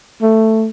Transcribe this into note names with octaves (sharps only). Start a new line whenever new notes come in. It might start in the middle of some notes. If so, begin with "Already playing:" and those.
A3